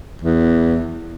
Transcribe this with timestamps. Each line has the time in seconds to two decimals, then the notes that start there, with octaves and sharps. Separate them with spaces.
0.22 E2